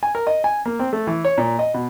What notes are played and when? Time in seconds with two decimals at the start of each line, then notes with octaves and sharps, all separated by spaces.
0.03 G#5
0.15 A#4
0.27 D#5
0.44 G#5
0.66 A#3
0.79 C4
0.93 A3
1.07 E3
1.25 C#5
1.38 A#2
1.59 D#5
1.74 B2